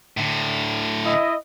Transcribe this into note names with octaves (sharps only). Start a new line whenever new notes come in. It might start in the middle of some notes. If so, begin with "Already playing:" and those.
A2 D3
E4 D#5